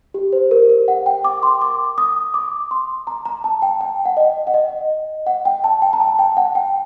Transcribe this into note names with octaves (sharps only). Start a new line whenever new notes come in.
G4
C5
A#4
A#4
F#5
G5
D6
C6
D6
D#6
D6
C6
A#5
A#5
A5
G5
G5
F#5
D#5
F#5
D#5
F#5
G5
A5
G5
A#5
A5
G5
F#5
G5